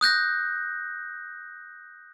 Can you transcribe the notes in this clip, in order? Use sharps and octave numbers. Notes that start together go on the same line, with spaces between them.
D#6 F#6 G6 A#6